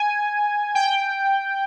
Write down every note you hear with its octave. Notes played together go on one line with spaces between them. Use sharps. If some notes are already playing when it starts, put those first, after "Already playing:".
Already playing: G#5
G5